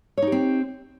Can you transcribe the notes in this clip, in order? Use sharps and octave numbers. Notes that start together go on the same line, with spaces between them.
C4 D#4 G4 C#5